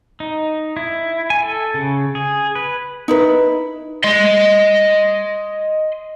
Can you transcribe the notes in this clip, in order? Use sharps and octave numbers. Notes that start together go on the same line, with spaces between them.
D#4
E4
G#5
A4
C#3
G#4
B4
D#4 E4 B4
D#5 C6